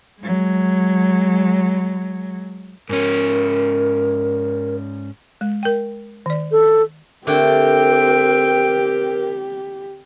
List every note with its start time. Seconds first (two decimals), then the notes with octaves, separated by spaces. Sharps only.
0.20 F#3 G#3
2.89 G#2 C#4 A#4
5.41 G#3
5.63 A#4 G5
6.26 D#3 D5
6.52 A4
7.27 D3 A3 C4 D4 G4 A#4 G5